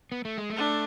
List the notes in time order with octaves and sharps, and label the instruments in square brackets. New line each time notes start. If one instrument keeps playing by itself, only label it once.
[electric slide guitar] B3
A3
G#3
A3
[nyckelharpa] D4